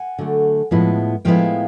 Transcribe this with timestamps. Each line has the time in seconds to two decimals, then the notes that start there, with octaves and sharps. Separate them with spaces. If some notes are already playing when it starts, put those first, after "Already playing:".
Already playing: F#5 G#5
0.18 D3 F#3 A3
0.71 A2 F3 G#3 B3 E4
1.25 A2 F3 G#3 B3 E4 F5 G5